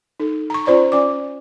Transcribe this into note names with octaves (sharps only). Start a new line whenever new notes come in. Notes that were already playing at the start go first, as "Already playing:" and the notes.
D#4 A4
A#5 C#6
C#4 F4 C5 D5 A#5 C#6
C#4 D5 D6